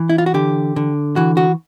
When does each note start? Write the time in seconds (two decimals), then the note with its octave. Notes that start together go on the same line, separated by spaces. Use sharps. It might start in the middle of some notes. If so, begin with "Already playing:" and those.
Already playing: E3
0.09 E4
0.18 F4
0.26 F#4
0.34 D3 G4
0.76 D3
1.16 E3 F#4
1.37 F#4